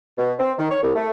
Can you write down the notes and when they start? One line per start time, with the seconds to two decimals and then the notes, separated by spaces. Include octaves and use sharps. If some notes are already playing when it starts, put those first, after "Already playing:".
0.18 B2
0.39 C4
0.58 D#3
0.70 C#5
0.83 C2
0.95 A3